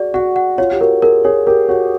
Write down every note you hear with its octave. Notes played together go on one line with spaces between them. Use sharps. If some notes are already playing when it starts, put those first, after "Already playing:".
Already playing: F#4 G#4 D5
F#4 F#5
F#5
F4 C#5
G4
F#4 A#4
G#4 A#4
G#4 C#5
G4 A#4
F#4 C#5